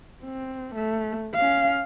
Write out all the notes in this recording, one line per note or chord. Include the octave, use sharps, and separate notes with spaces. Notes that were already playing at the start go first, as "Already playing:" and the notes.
C4
A3
C#4 F5